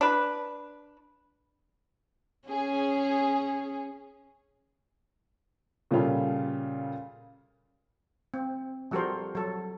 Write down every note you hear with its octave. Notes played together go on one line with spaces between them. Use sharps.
D4 B4
C#4 G#4
A#2 C#3 G3 C#4 F4 A4
C4
F3 G3 F#4 A4 A#4 C5
F#3 A4